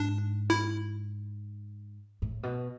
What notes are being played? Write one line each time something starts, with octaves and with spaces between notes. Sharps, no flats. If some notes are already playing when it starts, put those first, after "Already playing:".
Already playing: G#2 D4
E4
A2
B2